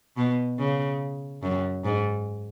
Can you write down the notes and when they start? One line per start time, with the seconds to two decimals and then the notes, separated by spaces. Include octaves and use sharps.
0.17 B2
0.59 C#3
1.42 F#2
1.85 G#2